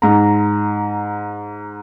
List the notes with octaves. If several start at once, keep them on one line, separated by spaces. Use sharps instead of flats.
G#2 A#5